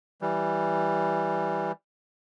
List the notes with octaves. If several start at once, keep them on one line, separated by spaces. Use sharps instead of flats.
E3 G3